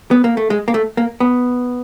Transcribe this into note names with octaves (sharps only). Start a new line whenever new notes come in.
B3
A#3
A3
G#3
A#3
A3
A#3
B3